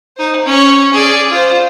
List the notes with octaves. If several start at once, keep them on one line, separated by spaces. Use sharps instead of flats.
D#4 C5
C#4 C#5
G#4 D5
F4 C5